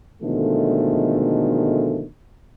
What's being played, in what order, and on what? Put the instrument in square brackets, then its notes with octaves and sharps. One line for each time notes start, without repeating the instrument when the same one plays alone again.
[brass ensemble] B2 D3 D#3 F3 G#3 A3